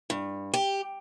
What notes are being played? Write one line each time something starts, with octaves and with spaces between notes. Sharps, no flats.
G2
G4